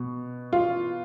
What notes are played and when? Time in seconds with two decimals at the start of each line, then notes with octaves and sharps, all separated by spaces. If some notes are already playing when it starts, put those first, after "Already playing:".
Already playing: B2
0.53 F4